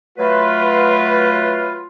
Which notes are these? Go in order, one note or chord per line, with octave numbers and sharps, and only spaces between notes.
F#3 A3 F4 B4